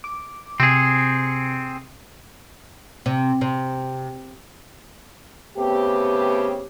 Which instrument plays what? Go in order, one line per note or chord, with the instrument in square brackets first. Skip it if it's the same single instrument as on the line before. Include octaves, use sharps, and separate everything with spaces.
[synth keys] D6
[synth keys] C3 C#7 [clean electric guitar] C4 G#4
[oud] C3
C3
[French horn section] C#3 A3 B3 C4 G4